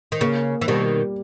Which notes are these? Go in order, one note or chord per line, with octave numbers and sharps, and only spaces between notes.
D#3
C#3 A#3
E3
B2 D#3 G3